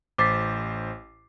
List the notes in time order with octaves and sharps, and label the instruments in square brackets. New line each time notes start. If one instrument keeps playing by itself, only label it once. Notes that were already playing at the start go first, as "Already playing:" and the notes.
[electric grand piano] A1 C5 C7 [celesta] D6 A6 B6